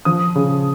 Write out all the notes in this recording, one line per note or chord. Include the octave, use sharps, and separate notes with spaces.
F3 D#6
C#3